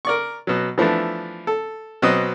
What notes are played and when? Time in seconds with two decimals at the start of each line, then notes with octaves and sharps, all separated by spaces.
0.05 A#4 D5 C#6
0.47 B2 F#3
0.78 E3 F3 A3 B3 D4
1.47 A4
2.02 B2 F#3 C4 D#5